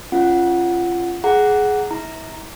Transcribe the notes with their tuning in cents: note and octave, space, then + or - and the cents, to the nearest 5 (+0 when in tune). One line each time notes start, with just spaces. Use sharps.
C#4 -10 F4 -20 F#5 +0
G#4 +15 F#5 +5 A#5 +0
E4 -35 A#5 +0